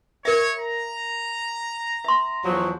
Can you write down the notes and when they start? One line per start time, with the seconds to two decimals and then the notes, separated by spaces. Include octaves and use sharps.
0.25 A#4 C#5 E5
0.59 A#5
2.04 E5 C6
2.45 E2 F3 F#3